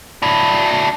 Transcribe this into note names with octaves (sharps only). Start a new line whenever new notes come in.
D4 E4